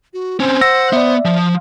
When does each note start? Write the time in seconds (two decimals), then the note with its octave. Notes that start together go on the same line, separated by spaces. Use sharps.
0.13 F#4
0.40 C4 C#4 C5
0.61 F#5 E6 A#6
0.93 B3 D5 E5
1.25 F3